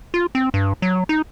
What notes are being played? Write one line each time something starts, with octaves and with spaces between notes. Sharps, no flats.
F4
C4
G2
F#3
D#4